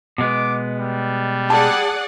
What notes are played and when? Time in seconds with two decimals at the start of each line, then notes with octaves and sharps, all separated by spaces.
0.18 B2 G#3 B3 D6
0.78 G3
1.50 G#4 D5 F#5 A5